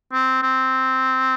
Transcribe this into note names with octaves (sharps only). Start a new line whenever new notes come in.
C4
C4